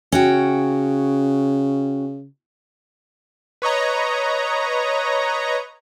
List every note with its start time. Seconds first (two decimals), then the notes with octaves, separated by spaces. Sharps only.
0.12 C#3 C#4 F#4 G5
3.62 B4 C#5 D#5 A#5